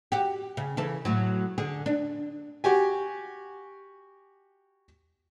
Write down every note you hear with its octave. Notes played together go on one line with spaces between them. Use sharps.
F#4 G4
C#3
C#3 E3 A4
A2 F#3
D3 G#4
D4
F#4 G4 G#5